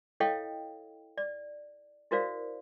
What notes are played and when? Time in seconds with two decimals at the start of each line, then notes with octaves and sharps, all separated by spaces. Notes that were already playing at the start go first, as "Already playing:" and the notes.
0.20 E4 A4 C#5 D#5 F5 G5
1.18 D5
2.11 E4 F#4 A#4 C5 D5 F5